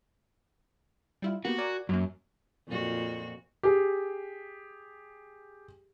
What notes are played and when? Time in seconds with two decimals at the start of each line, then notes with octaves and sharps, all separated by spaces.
1.22 G3 E4 F4
1.45 A#3 B3 F#4 G4
1.58 A#4 D5 G#5
1.89 F#2 F#3 A#3
2.68 F2 A#2 F#4
3.63 G4 G#4